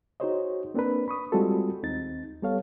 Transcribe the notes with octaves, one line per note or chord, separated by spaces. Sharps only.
D#4 F#4 G#4 C5 C#5 D#5
A#3 C4 D4 A#4 B4
B5 C#6 D#6
G3 G#3 C4 F4 F#4 A4
D#2 C4 D#4 A6
G3 B3 A4 C#5 F5